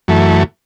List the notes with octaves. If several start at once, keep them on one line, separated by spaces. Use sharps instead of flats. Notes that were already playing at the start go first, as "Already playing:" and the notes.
F#2 E3 A3